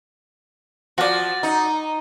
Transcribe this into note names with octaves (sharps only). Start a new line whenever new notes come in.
F3 F#4 D5
D#4